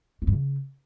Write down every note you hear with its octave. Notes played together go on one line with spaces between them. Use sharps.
F3
G2
C#3